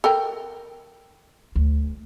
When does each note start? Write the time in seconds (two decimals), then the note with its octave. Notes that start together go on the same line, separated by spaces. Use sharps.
0.04 A4 A#4 G5
1.56 D2